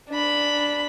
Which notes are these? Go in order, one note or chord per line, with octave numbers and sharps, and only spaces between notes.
D4 B5